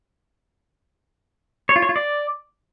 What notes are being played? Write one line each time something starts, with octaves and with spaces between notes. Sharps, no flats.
C#5
F4
C#5
F4
D5